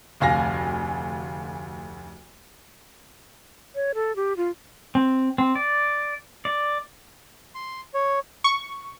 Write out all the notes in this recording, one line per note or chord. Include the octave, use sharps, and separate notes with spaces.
F1 D2 F5 G#5 A#6
C#5
A4
G4
F4
C4
C4
D5
D5
C6
C#5
C#6